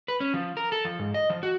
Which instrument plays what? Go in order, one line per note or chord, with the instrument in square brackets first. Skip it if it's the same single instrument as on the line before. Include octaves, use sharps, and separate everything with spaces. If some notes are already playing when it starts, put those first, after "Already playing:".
[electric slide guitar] B4
C#4
F3
A#4
A4
F3
G#2
D#5
F3
F#4